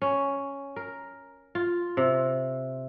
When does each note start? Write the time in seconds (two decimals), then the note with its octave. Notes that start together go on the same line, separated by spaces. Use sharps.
0.02 C#4
0.76 A#4
1.55 F4
1.97 C3